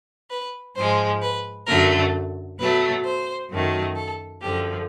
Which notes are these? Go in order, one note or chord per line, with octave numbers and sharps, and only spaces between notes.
B4
G#2 F3 G#3 C5
B4
F#2 D3 F#3 A3 A#4
B2 F#3 A3 B4
C5
F#2 D#3 F#3 A3
A4
F#2 D3 F3 G4